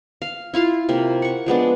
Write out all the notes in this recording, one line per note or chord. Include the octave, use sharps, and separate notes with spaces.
F5
E4 F4 F5 C6
C3 A#3
F#5 C#6
F3 G#3 B3 D4